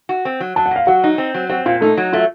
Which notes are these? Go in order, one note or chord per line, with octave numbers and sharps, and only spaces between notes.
F#4
C4
F#3
F#3 A5
F#5
A#2 F5
F#3 F#4 F#5
D#4
C4
F#3
C4 F#4 F#5
A#2 F4 F5
A3 D#4 A4
F#3
A3 F4